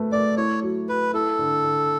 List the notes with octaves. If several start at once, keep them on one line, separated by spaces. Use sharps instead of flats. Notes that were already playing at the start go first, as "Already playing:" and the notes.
Already playing: A3 B4
A3 D5
E4 C#5
F#3
F#3 B4
E4 A4
D3
D3